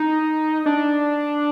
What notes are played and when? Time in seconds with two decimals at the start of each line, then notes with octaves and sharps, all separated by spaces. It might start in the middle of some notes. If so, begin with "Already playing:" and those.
Already playing: D#4
0.66 D4